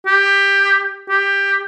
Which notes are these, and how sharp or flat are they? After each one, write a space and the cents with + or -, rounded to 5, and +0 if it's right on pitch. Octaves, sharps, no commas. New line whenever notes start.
G4 +15
G4 +15